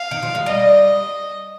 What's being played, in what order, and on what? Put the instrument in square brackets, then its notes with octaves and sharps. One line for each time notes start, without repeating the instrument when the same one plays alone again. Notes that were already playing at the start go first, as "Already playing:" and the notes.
Already playing: [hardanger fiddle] F5
[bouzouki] D#3
F3
G#3
[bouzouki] G3 [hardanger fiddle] D#5